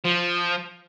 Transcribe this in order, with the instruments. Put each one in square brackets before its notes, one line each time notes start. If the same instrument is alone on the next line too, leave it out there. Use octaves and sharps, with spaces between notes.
[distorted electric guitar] F3